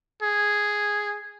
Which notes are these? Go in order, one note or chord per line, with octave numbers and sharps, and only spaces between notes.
G#4